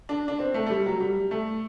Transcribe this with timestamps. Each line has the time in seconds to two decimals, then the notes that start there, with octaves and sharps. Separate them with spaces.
0.09 D4
0.28 D4
0.39 C4
0.54 A3
0.66 A3
0.70 G3
0.86 F#3
1.00 G3
1.31 A3